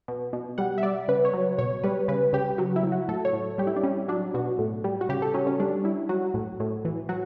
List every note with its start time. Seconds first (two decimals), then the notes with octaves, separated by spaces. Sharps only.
0.08 B2
0.33 B2
0.58 G3 F#5
0.78 E5
0.83 G3 D5
1.08 C#3 B4
1.25 C#5
1.34 F#3
1.58 B2 C#5
1.84 G3 B4
2.08 C#3 B4
2.33 C#3 G4
2.58 F#3 F#4
2.76 E4
2.83 F#3
2.92 F#4
3.08 A2 A4
3.25 C#5
3.33 A2
3.58 G3 G4
3.67 E4
3.76 D4
3.83 G3 C#4
4.08 F#3 D4
4.34 B2 F#4
4.59 A2
4.84 G3
5.01 F#4
5.09 C#3 G4
5.22 A4
5.34 F#3 C#4
5.47 C#4
5.60 G3 D4
5.84 G3 E4
6.09 F#3 F#4
6.34 A2
6.60 A2
6.85 E3
7.09 F#3 F#4